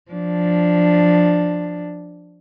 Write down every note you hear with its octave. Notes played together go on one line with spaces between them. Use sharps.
F3 D4